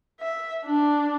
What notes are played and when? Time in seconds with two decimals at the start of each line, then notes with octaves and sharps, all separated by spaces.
0.20 E5
0.65 D4